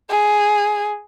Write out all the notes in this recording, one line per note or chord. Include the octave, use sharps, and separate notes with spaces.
G#4